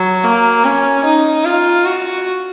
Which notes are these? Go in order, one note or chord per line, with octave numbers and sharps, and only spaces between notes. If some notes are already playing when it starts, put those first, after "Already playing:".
Already playing: F#3
A#3
C#4
D#4
F4
F#4